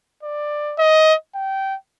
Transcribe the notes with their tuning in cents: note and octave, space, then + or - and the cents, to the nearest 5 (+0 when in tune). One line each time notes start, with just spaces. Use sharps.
D5 +15
D#5 +15
G5 -20